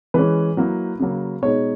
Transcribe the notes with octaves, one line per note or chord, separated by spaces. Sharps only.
E3 G#3 C#4 B4
F#3 A#3 E4
C#3 F#3 A#3
B2 G#3 D#4 C#5